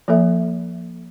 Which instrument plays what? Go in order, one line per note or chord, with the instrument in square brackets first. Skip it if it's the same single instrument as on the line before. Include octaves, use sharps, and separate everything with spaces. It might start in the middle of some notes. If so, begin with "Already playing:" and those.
[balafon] F3 A#3 A4 E5